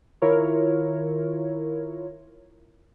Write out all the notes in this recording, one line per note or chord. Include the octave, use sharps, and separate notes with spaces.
D#3 E4 F4 A#4 C#5